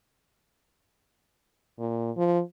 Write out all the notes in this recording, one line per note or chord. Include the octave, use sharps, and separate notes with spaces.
A#2
F3